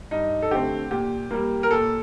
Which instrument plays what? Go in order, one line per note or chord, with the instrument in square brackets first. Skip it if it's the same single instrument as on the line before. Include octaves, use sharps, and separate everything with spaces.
[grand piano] G2 D#4
A4
D3 A3 C4 G4
A#2 G4
G3 A#3
A#4
A#2 A4